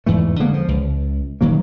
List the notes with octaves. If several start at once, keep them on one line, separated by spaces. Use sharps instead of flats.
E2 G#2 E3 A3
D3 G#3 A#3 B3
F3
C#2
D#1 D#3 F#3 A#3